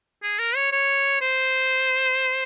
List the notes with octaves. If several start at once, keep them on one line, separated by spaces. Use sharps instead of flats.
G#4
A#4
C#5
C#5
C5